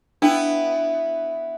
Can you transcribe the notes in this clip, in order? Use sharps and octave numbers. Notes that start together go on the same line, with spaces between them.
B3 D4 E4 G5